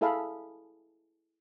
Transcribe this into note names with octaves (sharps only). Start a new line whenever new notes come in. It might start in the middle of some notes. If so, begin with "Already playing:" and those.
E4 G#4 A4 E5 F5 B5